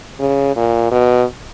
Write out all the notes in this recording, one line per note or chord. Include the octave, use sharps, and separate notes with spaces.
C#3
A#2
B2